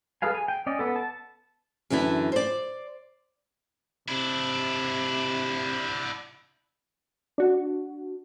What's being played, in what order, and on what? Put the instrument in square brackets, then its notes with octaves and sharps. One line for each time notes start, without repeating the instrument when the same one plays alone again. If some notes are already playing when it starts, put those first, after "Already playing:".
[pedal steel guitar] G#4 A4 B4 F5 G#5
G#5
G5
C#4 D5 D#5
B3 A4
A5
[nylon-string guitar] F#2 D3 E3 D4 E4
C5 D5
[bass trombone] C3 [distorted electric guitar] D4 E4
[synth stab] D4 F#4